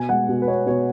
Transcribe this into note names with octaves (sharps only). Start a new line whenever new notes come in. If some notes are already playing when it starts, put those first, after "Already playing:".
Already playing: B2 G#5
G#3 F#5
B2
B4
B3 C#5
B2 C#5